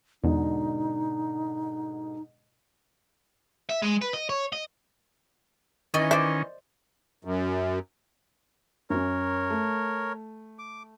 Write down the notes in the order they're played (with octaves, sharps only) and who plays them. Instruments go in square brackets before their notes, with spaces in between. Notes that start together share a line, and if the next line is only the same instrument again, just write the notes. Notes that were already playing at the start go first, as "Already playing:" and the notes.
[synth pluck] E2 [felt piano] G#2 B2 D3 [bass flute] D#4
[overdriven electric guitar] E5
G#3
B4
D#5
C#5
D#5
[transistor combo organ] D#3 C#4 [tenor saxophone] E3 [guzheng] D#5
[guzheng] C5 D5 [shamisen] E5
[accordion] F#2
[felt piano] F#2 C#4 [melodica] A#4 C#5
[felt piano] A3
[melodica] D6